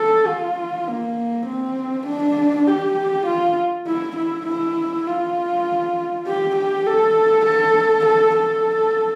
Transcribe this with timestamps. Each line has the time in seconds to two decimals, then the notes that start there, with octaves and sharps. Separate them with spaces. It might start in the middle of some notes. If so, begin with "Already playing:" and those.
Already playing: A4
0.27 F4
0.88 A#3
1.47 C4
2.07 D4
2.67 G4
3.26 F4
3.87 E4
4.17 E4
4.47 E4
5.07 F4
6.26 G4
6.56 G4
6.87 A4
7.46 A4
8.06 A4
8.36 A4